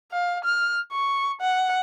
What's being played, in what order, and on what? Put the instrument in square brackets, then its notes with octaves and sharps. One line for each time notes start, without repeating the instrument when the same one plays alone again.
[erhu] F5
F6
C#6
F#5